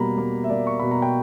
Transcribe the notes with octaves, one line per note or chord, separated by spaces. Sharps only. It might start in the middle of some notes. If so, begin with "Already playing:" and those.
Already playing: B2 G3 A#3 A#5 B5
A#3
E5
A#3 D5
C#6
B2 B5
A#5
G5